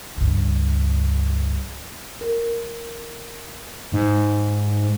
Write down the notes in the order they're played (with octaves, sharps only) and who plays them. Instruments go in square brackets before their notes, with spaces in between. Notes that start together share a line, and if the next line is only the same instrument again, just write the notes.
[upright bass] C#2 G2
[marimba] A#4
[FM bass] G#2